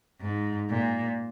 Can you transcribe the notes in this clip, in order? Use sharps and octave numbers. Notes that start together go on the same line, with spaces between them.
G#2
A#2